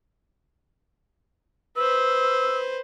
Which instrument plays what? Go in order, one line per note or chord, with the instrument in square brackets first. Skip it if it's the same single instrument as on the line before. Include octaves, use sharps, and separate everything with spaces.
[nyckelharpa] B4 C5 [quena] E6